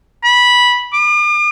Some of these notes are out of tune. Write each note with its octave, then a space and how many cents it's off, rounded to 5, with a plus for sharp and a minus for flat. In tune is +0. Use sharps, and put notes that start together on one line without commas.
B5 -10
D6 +45